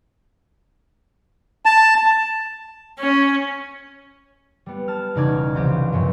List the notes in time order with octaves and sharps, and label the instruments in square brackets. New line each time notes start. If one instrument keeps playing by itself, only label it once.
[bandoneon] A5
[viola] C#4
[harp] G3 B3
A5 F6
E1 C#3 D#4 D5 F6 G#6
C2 E3 F3 C4 G4
F#2 A#2 C#3